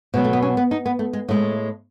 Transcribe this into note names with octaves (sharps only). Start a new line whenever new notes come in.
B2 F#3 G#3
A3
B3
C#4
B3
D#4
B3
A3
G#3
A2 G#3 A3